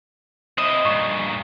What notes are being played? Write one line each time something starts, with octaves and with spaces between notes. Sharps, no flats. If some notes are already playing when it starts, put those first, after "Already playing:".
C4 E4 D#5
G2 A#2 C#6